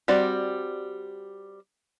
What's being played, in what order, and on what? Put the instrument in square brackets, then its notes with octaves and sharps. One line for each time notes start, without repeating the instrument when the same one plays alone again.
[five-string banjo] G3 C4 F#4 D5